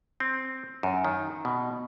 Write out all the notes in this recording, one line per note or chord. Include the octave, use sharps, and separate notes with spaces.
C4
F#2
D#3
B2